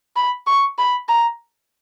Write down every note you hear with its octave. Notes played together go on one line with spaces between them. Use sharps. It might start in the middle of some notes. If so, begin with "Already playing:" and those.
B5
C#6
B5
A#5